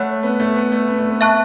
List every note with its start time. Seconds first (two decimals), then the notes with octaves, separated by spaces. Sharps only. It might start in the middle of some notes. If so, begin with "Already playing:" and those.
Already playing: A3 C#5 F#5 B5 F#6
0.23 B3
0.40 A3
0.56 B3
0.72 A3
0.89 B3
0.99 A3
1.11 B3
1.21 E5 A5 C#6 F#6